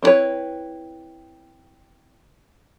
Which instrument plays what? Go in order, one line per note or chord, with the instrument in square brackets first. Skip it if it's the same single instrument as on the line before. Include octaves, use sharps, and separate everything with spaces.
[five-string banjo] C4 D4 E4 B4 C#5